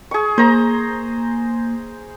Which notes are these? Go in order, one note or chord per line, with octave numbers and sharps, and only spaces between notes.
G#4 C#6
A#3 C5 A#5